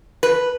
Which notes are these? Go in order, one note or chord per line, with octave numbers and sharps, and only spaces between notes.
B4